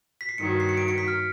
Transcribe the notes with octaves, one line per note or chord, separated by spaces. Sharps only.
B6
C7
G2 D#3 F#3 C#7
C7
C#7
D7
C#7
B6
F6